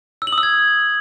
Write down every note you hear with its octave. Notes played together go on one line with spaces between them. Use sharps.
E6
F#7
D#6
E6
G#6